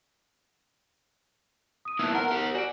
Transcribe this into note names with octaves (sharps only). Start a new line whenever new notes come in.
D#6 D#7
A#3 B3 D#4 E4 A5 E6 F#6
A#4 F#5 A#5
G4 A#4
F#4 D5 G#5 D7